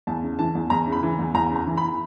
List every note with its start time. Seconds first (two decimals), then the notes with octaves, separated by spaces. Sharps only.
0.07 E2 A5
0.23 C#3
0.39 E3 A5
0.55 E2
0.70 E2 A#5
0.87 C#3
0.92 B5
1.03 E3
1.19 E2
1.34 E2 A#5
1.50 C#3
1.56 A#5
1.67 E3
1.77 B5